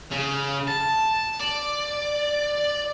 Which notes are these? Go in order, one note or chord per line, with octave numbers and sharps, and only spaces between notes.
C#3
A5
D5